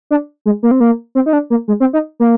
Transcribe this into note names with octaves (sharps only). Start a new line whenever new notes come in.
D4
G#3
A#3
C4
A#3
C4
D#4
D4
A#3
G#3
C4
D#4
A#3